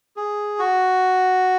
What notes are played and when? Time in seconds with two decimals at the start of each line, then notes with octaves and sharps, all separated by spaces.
0.17 G#4
0.59 F#4